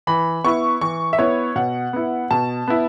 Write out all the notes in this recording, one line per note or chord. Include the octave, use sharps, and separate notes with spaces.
E3 B5
B3 E4 C#6
E3 C#6
E5
B3 E4 C#5
B2 F#5
B3 E4
B2 A5
B3 E4